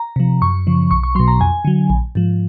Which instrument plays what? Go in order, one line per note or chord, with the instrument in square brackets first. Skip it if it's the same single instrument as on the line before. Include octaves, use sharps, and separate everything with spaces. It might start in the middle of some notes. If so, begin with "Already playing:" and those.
Already playing: [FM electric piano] A#5
C3 F3
F#2 C#6
C#3 F3
B1 C#6
C#6
B2 F#3 C6
A#5
F2 G#5
D3 F#3
A#1
G#2 F3